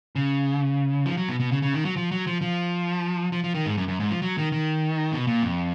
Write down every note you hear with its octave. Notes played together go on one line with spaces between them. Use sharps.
C#3
F3
F#3
B2
B2
C#3
C#3
D#3
F#3
F3
F#3
F3
F3
F3
F3
D#3
G#2
F#2
F#2
G#2
F3
F#3
D#3
D#3
B2
A#2
F2